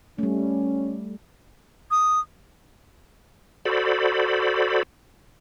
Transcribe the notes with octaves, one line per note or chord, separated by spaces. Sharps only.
G3 A3 C#4
D#6
F#4 A4 C5 D5 B5